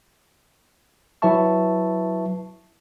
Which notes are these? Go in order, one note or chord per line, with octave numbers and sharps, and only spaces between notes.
F#3 E4 B4 E5 A5 C#6